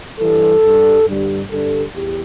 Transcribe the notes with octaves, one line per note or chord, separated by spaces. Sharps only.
G2 E3 G3 A4
G2 G3
G2 D3 G3
G2 D3 G3 A4
E2 G4